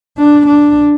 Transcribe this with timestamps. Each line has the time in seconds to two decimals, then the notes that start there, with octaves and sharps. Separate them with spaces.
0.18 D4
0.47 D4